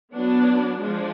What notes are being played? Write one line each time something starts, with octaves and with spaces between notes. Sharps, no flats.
F#3 B3 D4
F3 G#3 D4